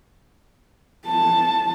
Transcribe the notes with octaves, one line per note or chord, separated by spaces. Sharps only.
A5